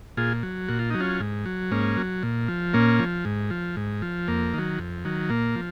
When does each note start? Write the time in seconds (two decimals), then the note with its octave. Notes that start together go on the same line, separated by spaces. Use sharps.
0.17 A#2 F4 G#4
0.43 F#3
0.68 A#2 F#4
0.79 F4
0.90 F#3 D#4
1.00 C#4 F4
1.20 G#2
1.46 F#3
1.71 G#2 A#3 C#4
1.97 F#3
2.23 A#2
2.48 F3
2.74 A#2 A#3 C#4
2.99 F3
3.25 G#2
3.50 F3
3.76 G#2
4.02 F3
4.28 F2 A#3
4.54 D#3 F#3
4.79 F2
5.05 D#3 F#3
5.30 A#2 A#3
5.56 F3